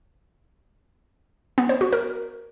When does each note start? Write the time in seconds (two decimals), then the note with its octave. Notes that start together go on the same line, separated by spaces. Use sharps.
1.58 B3
1.69 C5
1.81 F#4
1.93 A#4